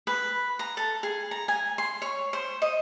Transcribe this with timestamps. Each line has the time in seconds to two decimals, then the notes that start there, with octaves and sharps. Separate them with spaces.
0.07 B4
0.59 A#5
0.77 A4
1.03 G#4
1.31 A#5
1.48 G#5
1.78 C6
2.02 C#5
2.33 C5
2.62 D#5